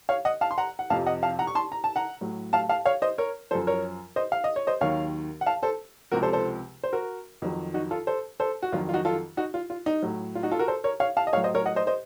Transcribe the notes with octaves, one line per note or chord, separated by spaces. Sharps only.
C#5 F5
D#5 F#5
F5 A5
C6
F#5 A#5
F#5
F2 C3 F3 F5 A5
D#5 F#5
F5 A5
F#5 A#5
C#6
A5 C6
A#5
A5
F#5 A#5
A2 F#3
F5 A5
F5 A5
C#5 F5
C5 D#5
A#4 C#5
F#2 F3 A4 C5
A#4 C#5
C5 D#5
F5
D#5
C#5
C5 D#5
D#2 D#3 F#3 C#5 F5
F#5
F5 A5
A4 C5
C#2 C3 F3 F#4 A#4
A4 C5
A4 C5
C5
F#4 A#4
F2 D#3 F#3
D#4 F#4
F4 A4
A4 C5
A4 C5
F#4
F2 D#3 F#3 F4
F4
D#4 F#4
F4 A4
D#4 F#4
F4
F4
D#4
A2 F#3
F4
D#4 F#4
F4 A4
F#4 A#4
A4 C5
A#4 C#5
C#5 F5
F5 A5
D#5
A2 F#3 C#5 F5
C5 D#5
A#4 C#5
D#5 F#5
C5 D#5
C5 D#5